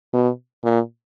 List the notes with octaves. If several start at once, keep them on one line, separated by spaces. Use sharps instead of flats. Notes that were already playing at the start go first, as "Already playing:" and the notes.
B2
A#2